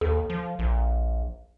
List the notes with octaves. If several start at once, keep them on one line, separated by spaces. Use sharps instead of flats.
D#2 A4
F3
A#1